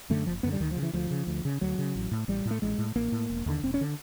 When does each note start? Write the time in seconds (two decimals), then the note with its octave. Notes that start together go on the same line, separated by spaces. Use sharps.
0.10 F#2 D3 A3
0.26 F#1 F3
0.43 F#2 D3 B3
0.53 G3
0.60 D2 D#3
0.71 F3
0.77 C#3
0.82 E3
0.93 D2 F3
1.11 C#3
1.27 D2
1.45 C#3
1.61 D2 F#3
1.78 C#3
1.95 A1
2.12 A2
2.28 A1 G3
2.46 A2
2.51 A3
2.62 A1 G#3
2.78 A2
2.96 A1 A#3
3.12 A2
3.30 E1
3.46 D#2 D3
3.63 E1 C4
3.74 C#4
3.81 D3